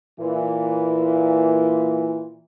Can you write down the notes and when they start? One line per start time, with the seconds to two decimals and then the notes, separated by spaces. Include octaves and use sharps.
0.20 A#2 E3